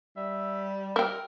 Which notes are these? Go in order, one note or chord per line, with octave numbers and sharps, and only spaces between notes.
G3 E5
A#4 E5 G5